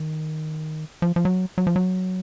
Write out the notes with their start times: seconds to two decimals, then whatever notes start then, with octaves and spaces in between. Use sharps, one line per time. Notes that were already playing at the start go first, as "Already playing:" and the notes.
Already playing: D#3
1.02 F3
1.16 F3
1.25 F#3
1.58 F#3
1.67 F3
1.76 F#3